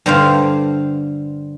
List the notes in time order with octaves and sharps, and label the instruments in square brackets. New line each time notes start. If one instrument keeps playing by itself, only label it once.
[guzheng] G2 D3 C5 F5